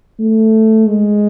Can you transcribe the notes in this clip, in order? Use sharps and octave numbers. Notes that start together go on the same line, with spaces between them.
A3
G#3